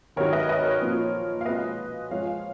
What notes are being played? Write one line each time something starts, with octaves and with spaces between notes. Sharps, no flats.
D#3 F#3 B3 D#4 A#4 C#5
B4 D#5
B4 D#5
A#4 C#5
A#2 F3 B3 F4
F5
B2 G#3 B3 F4 B4 D#5
F3 G#3 B3 F4 C#5 F5